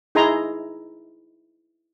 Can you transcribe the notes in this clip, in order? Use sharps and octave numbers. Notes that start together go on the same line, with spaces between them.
D#4 E4 G#4 G#5 A#5 C6